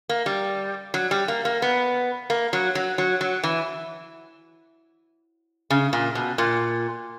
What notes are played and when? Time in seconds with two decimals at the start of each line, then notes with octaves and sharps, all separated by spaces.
0.09 A#3
0.26 G3
0.94 F#3
1.11 G3
1.28 A#3
1.45 A#3
1.62 B3
2.30 A#3
2.53 F#3
2.75 F#3
2.98 F#3
3.21 F#3
3.44 E3
5.70 C#3
5.93 A#2
6.15 B2
6.38 A#2